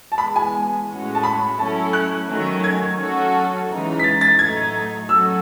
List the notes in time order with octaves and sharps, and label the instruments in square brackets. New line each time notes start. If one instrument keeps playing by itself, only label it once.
[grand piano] A5
[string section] E3 G#3 B3 [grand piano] B5
[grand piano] G#5
[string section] A2 G#3 C#4 F#4
[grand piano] A5
B5
[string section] F#3 A3 C#4 E4 [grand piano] A5
[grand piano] F#6
[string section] D#3 F#3 A3 C#4
[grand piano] G#6
[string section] F#3 C#4 F#4 A4
C#3 E3 G#3 D#4
[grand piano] B6
A6
A6
[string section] A2 F#3 A3 D#4 [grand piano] G#6
[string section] F#3 C#4 F#4 A4 [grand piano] E6